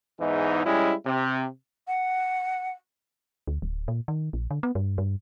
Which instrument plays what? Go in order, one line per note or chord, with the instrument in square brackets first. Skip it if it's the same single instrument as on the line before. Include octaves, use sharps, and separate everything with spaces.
[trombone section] E2 G#2 E3 D#4
G3 G#3 C#4 E4
C3
[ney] F#5
[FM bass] D2
D1
A#2
D#3
A#1
D3
B3
G2
G2